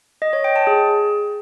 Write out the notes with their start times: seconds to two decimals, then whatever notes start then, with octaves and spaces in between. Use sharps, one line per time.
0.22 D#5
0.33 C#5
0.44 G5
0.56 A5
0.67 G#4